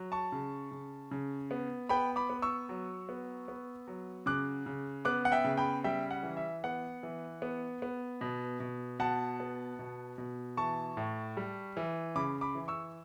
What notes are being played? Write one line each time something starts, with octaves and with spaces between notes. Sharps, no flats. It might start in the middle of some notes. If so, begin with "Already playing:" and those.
Already playing: F#3
A5 C#6
C#3
C#3
C#3
B3
B3 G5 B5
B5 D6
B3
C#6 E6
F#3
B3
B3
F#3
C#3 D6 F#6
C#3
B3 D6 F#6
F#5
E5 G5
C#3
G5 B5
G3 E5 G5
F#5
E3
E5
B3 F#5
E3
B3
B3
B2
B2
B2 F#5 A5
B3
B2
B2
E3 A5 C#6
A2
G3
E3
C#3 B5 D6
B5 D6
E3
C#6 E6